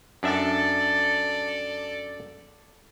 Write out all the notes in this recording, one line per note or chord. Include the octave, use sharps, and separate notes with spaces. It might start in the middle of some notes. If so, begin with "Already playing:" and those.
F#2 D4 A4 D5 E5